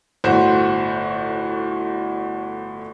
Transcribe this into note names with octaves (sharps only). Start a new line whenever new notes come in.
G1 A2 F#4 C5